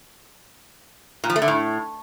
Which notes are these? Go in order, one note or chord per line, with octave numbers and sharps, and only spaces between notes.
A#2
F3
A3
D3
A2